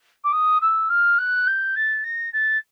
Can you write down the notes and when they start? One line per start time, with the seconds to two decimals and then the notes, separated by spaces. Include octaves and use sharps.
0.24 D6
0.32 D#6
0.61 E6
0.89 F6
1.18 F#6
1.47 G6
1.75 A6
2.03 A#6
2.32 A6